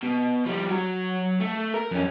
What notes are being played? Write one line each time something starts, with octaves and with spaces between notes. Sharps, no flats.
B2
F3 G3
F#3 F#4
A3
A#4
F2 C#4